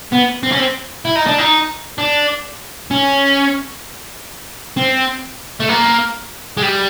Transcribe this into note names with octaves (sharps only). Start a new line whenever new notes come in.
B3
C4
C#4
C4
E4
D#4
D4
D#4
D4
C#4
C4
A3
A#3
G#3
G3